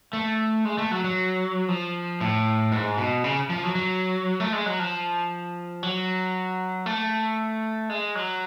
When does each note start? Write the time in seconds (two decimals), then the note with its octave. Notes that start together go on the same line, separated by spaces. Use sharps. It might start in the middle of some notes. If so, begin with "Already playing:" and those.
0.13 A3
0.65 G#3
0.78 A3
0.91 F#3
1.04 F#3
1.68 F3
2.20 A2
2.72 G#2
2.98 B2
3.24 C#3
3.50 F3
3.63 F#3
3.75 F#3
4.40 A3
4.53 G#3
4.66 F#3
4.79 F3
5.83 F#3
6.86 A3
7.90 G#3
8.15 F#3